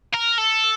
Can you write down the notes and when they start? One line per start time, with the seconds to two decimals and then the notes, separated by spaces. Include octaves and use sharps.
0.14 A#4
0.38 A4